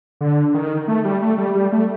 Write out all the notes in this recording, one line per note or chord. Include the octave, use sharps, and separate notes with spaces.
D3
D#3
A3
G3
A3
G3
G3
A3